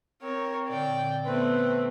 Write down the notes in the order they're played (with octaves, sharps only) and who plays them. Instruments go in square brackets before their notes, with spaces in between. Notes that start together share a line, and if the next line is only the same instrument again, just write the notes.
[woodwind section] C4 [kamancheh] A#4 C#5
[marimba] A#2 D3 [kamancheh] D5 G5
[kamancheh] A3 C4 [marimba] B3 [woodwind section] B4